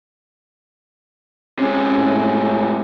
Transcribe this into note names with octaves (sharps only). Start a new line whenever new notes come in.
C3 G#3 C#4
A2